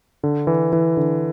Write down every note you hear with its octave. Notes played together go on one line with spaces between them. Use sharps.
D3
E3
E3
D3